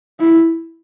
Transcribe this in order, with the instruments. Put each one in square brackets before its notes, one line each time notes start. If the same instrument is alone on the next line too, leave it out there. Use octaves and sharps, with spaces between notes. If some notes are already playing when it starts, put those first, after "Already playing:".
[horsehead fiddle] E4